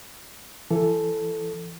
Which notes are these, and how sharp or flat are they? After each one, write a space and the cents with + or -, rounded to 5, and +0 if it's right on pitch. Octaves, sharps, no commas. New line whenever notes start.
E3 +30 A4 +0